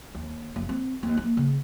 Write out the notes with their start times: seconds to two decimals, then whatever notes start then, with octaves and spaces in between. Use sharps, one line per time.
0.15 D#2
0.56 F#1
0.69 C4
1.03 D#2
1.17 A#3
1.37 C#3